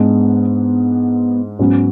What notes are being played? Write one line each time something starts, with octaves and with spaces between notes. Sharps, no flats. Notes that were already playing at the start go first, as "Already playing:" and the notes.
Already playing: G#2 G#3 B3 D4
G#2 F#3 B3 C#4